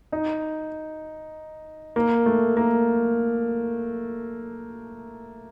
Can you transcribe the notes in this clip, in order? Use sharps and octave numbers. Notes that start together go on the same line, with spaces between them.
D#4
A#3
A3
A#3